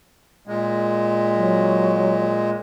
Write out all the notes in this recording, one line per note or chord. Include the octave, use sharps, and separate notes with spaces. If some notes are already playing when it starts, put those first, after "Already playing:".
A#2 G#3
F#3